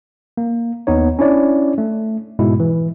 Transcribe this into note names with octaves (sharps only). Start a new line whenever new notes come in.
A#3
D#2 B3 D#4 C#5
C#4 D4 E4 C#5 D5
A3
G#2 B2 G#3 E4
E3